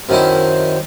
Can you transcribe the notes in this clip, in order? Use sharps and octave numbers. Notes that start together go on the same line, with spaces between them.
F#2 D#3 E4 C5